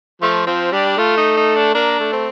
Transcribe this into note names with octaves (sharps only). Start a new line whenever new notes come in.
F3 A3 F4
F3 C4 F4
G3 D4 G4
A3 F4 A4
D#4
D#4
D4
A#3 D4 A#4
A3 A4
C4